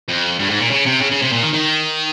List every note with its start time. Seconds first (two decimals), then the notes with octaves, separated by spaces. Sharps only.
0.08 F2
0.39 G2
0.50 G#2
0.60 A#2
0.70 C#3
0.86 C3
1.01 C#3
1.11 C#3
1.22 C3
1.32 A#2
1.43 D#3
1.53 D#3